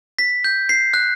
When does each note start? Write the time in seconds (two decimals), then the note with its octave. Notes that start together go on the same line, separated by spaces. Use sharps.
0.19 B6
0.44 G6
0.69 C7
0.94 F#6